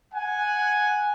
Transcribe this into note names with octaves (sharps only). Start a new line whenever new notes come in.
F#5 G#5